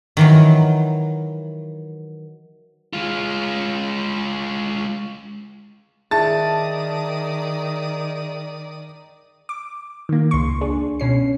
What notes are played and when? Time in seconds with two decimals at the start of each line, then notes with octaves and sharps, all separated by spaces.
0.17 D#3 E3 F#3
2.93 G#3 F4
6.11 D#3 G#4 D5 E5 A5 D#6 A6
9.49 D6
10.09 D#3 A#3
10.31 C#2 C6 C#6
10.61 D4 G#4
11.00 B2 C#4 C7